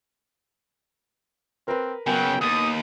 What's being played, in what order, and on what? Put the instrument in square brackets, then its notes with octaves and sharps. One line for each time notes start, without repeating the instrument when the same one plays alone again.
[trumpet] C4 [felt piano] A#4 B4
[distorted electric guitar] C#3 F#3 [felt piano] B3 A#4 G#5 [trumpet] G5
[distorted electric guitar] D#2 [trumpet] D#6